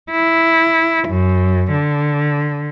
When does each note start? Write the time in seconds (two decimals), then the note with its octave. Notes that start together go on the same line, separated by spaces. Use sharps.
0.11 E4
1.08 F#2
1.72 D3